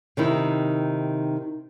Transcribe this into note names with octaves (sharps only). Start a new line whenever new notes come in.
C3 D#3 D#4 E4